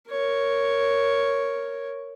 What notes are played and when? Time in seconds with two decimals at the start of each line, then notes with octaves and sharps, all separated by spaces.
0.11 A#4 C#5